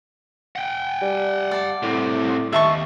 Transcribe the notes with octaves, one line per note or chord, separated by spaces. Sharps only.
F#5 G5
G3
D5 A5
C2 A2 C3
D#2 E5 A5 C#6